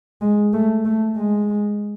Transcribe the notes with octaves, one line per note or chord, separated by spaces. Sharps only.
G#3
A3
A3
G#3